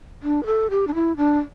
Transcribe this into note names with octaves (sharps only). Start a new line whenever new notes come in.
D4
B4
A4
G4
D4
E4
D4